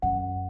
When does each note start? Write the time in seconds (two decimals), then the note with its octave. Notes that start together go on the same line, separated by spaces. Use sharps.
0.02 F#2 F#5